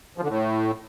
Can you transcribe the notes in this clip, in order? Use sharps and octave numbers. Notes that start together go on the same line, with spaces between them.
F3
D3
A2